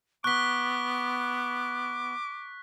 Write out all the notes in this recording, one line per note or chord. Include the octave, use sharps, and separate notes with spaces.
B3 C#6 D6 F#6 B6 G7